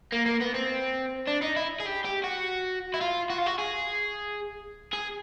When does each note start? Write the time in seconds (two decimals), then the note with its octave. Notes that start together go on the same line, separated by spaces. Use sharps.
0.12 A#3
0.26 A#3
0.41 B3
0.55 C4
1.28 D4
1.42 D#4
1.56 E4
1.80 G#4
1.86 G4
2.05 G4
2.24 F#4
2.94 E4
3.01 F4
3.30 F#4
3.38 F4
3.46 F#4
3.59 G#4
4.93 G#4